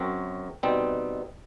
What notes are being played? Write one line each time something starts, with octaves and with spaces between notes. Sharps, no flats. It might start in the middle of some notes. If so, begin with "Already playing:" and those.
Already playing: F#2 F#3 C4
B2 G3 C4 D#4